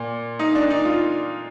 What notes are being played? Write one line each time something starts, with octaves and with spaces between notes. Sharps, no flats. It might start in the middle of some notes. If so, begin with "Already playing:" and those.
Already playing: A#2
D#4
D4
D#4
F4